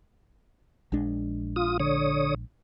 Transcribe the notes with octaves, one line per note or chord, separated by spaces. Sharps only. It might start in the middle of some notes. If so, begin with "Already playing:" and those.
A#1 G#3 D4
F4 D#6
D3 C#5 D#6